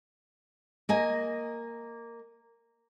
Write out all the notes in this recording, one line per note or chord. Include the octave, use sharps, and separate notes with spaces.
A#3 D#5 G#5